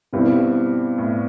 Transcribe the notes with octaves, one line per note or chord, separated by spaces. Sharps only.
G2 B2 G3 C4 E4 G4
A2